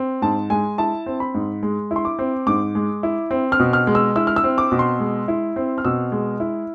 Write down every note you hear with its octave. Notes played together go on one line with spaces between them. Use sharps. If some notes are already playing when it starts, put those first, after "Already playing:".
Already playing: C4
G#2 A5
G#3 G#5
E4 A5
C4
B5
G#2
G#3
E4
C6
D6
C4
G#2 D6
G#3
E4
C4
F6
B2
F6
G#3
E6
E4 E6
F6
E6
C4
D6
B2
C6
G#3
E4
C4
F6
B2 E6
G#3
E4